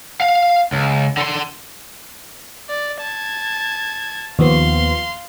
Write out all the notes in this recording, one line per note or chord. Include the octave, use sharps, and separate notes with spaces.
F5
C#2
D3 C6
D5
A5 G#6
D#2 F3 B3 F5 C6